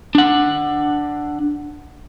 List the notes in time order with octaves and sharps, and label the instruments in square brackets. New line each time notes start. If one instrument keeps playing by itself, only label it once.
[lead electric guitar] D4 F#5